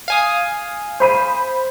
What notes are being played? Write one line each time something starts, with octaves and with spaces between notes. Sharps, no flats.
F5 G#5 D#6
C5 B5 D#7